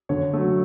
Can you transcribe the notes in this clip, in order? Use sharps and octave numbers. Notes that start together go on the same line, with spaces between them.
D3 C#5
F#3 A3